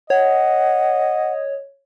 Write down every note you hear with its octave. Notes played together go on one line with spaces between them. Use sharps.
C#5 D#5 F#5